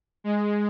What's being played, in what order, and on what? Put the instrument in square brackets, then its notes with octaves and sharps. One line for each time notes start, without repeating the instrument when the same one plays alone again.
[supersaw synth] G#3